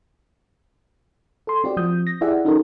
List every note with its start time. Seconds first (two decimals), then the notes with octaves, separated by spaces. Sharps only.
1.47 A4 C6
1.64 C4 F#4 G4 D5
1.77 F3 C4 D#6 G6
2.07 A#6
2.21 E4 G4 G#4 D5 E5 F#5
2.45 C#4 D#4 F#4 G4 A4 A#4